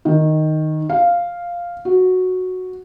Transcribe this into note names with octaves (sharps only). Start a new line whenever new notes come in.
D#3
F5
F#4